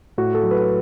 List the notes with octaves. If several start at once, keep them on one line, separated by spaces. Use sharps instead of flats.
A2 F#4
A4
F#3
B4